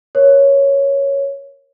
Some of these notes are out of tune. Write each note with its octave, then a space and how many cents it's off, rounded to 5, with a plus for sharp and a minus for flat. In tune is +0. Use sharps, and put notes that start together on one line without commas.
A#4 +20 C#5 +0